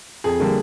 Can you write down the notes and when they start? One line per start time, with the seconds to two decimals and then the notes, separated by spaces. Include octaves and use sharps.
0.24 F2 G#4
0.40 D3 G3 A#3